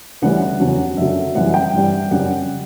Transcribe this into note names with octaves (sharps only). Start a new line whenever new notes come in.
D2 C#3 E3 G3 F#5
F#5
E2 C#3 F#3
F#2 D3 F#3 E5
F#2 E3 G3 F#5
G5
G2 E3 G3
F#2 C#3 G3 F#5